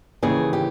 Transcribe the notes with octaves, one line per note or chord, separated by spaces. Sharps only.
D#2 C#3 E3 G#4
G4